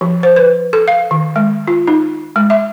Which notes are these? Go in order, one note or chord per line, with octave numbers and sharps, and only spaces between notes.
F3
C5
B4
A4
F5
D#3
G#3
F4
D#4
G#3
E5